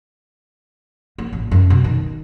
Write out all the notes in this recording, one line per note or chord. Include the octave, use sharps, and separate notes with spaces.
A#3
A1
F#2
B2
D#3